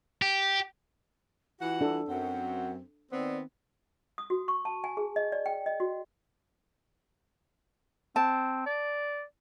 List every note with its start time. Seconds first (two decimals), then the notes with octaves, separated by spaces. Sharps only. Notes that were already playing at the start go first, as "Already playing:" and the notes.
0.22 G4
1.60 E3 F4 F#4 F#5
1.81 D4 A4
2.08 F#2 C4 F#5
3.12 D#3 B3 C4 D5
4.18 D#6
4.30 F#4
4.48 C#6
4.65 A5
4.84 G#5
4.97 G#4
5.16 D#5
5.32 D5
5.46 G5
5.66 D#5
5.80 F#4
8.16 C4 A5
8.66 D5